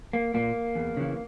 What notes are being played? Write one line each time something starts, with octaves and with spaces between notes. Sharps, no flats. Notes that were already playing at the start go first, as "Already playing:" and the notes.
A#3
A#2 A#3
E2
C#3 E3